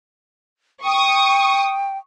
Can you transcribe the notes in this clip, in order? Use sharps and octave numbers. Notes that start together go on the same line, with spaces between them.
G5 C#6 D#6